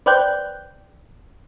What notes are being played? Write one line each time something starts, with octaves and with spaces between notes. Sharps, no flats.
B4 C5 D5 G5 F#6 G6